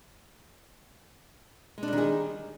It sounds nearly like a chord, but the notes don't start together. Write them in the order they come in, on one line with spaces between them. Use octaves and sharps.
G#3 D4 G3 D#3 G#4